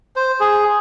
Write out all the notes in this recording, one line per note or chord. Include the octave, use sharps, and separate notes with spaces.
C5
G#4